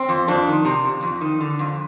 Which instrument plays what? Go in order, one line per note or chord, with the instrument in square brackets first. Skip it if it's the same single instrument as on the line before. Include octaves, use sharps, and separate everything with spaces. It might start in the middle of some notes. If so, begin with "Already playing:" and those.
Already playing: [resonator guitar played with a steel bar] C4
F2
F2 D4
D#3
C3
F2
F2
D#3
D3
F2